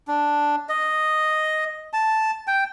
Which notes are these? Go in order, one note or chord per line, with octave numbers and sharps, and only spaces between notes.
D4
D#5
A5
G5